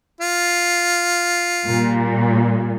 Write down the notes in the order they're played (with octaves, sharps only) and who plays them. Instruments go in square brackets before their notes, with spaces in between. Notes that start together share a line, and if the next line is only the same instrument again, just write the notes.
[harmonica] F4
[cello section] A#2 G3